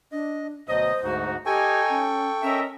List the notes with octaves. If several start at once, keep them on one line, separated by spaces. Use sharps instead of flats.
D4 D#5
D2 B2 F#3 C5 D#5
D2 G#2 D#4 F#4
D#4 G4 A4 G5 G#5 C#6
C#4
C#4 A#4 D#5 E5